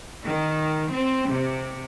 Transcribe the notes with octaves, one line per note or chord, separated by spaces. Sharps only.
D#3
C4
C3